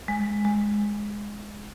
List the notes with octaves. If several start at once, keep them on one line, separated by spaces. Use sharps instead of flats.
G#3
G#3